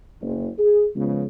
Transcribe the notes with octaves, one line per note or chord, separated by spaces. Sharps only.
F#1
G#4
C#3 F3 G#3 B3